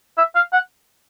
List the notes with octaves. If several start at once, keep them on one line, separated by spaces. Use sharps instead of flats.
E5
F5
F#5